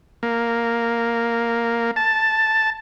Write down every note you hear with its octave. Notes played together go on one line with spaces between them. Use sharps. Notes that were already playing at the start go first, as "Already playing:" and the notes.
A#3
A5